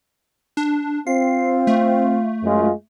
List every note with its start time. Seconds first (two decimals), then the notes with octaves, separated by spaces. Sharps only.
0.57 D4
1.07 C4 F4 C7
1.67 A3
2.43 F#2 G#3 F4